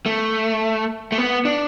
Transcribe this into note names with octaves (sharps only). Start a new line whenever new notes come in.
A3
A3
B3
D4